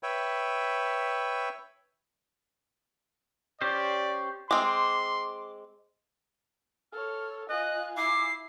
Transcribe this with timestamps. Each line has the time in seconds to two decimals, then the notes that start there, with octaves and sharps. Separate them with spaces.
0.03 B4 C#5 E5 G5
3.61 C#4 G4 C5 D5
4.51 G#3 C4 C6 D6
6.92 A4 C#5 F6
7.49 F4 D#5 G#5 F#6
7.97 E4 D6 C7